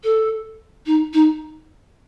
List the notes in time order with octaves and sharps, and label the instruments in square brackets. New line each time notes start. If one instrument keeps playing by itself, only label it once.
[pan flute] A4
D#4
D#4